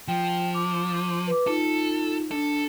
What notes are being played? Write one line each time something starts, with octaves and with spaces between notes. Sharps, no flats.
F3 G5
D6
B4 D6
D#4 F4 A4
D4 A4